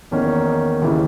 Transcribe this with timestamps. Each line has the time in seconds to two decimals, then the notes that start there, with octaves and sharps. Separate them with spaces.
0.11 E2 D#3 A#3 C#4
0.82 D#2 C#3 E3